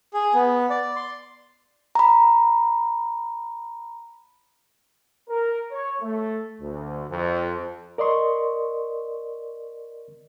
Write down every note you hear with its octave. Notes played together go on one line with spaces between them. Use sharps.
G#4
B3
D5
C6
A#5 B5
A#4
C#5
A3
D2
F2
A#4 D5 D#5 C6 C#6